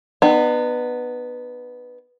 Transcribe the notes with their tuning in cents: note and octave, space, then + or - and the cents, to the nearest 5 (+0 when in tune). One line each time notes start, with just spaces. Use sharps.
B3 +0 D#4 -45